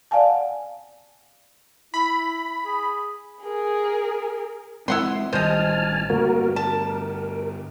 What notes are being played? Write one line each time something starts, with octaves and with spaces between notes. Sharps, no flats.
D5 F5 F#5 G#5 A5
E4 B5
G#4
G#4 A#4
E3 G#3 C4 E4 F#5 C6
A1 D#3 G3 C5 D#5 G#5 A5 F6
G2 D3 A3 A#3 F#4 A#4
A#4 A5